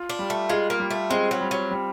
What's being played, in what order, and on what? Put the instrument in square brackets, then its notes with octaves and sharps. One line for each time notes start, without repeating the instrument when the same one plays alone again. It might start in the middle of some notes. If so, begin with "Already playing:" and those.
Already playing: [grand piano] F4
[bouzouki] D4
[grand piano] G3
[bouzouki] A3
[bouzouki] G#3 [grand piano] F4
[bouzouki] A#3
[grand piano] G3
[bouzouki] A3
[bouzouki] G#3 [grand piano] C4
[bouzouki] F#3
[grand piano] G3
[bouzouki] F#3
[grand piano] G3